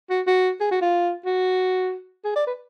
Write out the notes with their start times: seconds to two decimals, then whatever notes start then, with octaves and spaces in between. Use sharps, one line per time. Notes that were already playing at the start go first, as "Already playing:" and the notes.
0.10 F#4
0.27 F#4
0.60 G#4
0.71 F#4
0.81 F4
1.25 F#4
2.25 G#4
2.36 D5
2.47 B4